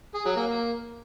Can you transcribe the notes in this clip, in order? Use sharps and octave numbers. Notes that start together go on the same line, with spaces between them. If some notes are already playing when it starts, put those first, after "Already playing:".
G#4
F#3
A#3
A#3